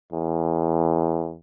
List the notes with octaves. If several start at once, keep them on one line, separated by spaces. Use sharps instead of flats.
E2